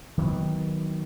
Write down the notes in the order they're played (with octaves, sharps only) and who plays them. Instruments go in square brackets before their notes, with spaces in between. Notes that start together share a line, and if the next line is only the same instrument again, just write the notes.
[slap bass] D#3 F#3 G3 B3